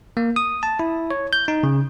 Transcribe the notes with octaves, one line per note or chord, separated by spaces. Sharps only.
A#3
D#6
A5
E4
C#5
G6
D#4
C#3